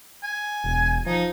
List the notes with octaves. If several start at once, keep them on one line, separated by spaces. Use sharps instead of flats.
G#5
E1
F3 D#4